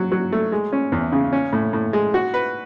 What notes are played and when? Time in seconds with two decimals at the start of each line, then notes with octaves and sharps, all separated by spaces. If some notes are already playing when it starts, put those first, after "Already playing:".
Already playing: F#3
0.12 F#3
0.32 A3
0.52 G#3
0.73 C#4
0.92 E2
1.12 C#3
1.33 C#4
1.53 A2
1.73 A2
1.93 G#3
2.14 F#4
2.34 B4